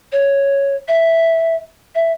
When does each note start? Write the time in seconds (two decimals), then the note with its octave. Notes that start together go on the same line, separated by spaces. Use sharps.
0.12 C#5
0.88 E5
1.95 E5